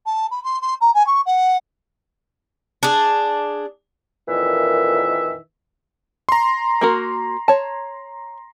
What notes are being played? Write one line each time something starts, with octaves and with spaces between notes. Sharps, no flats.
A5
B5
C6
C6
A#5
G#5
C#6
F#5
D4 G#4
F2 A#2 D#3 E3 E5
A#5 C6
A#3 F#4 A#4
C#5 A5